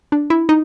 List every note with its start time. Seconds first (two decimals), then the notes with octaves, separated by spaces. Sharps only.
0.12 D4
0.30 E4
0.49 D#4